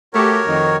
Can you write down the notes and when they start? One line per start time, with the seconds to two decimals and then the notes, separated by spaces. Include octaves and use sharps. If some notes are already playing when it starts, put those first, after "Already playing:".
0.14 A3 F#4 G4 A#4 C#5
0.46 F2 D#3